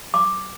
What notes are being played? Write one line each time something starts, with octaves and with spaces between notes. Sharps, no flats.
D6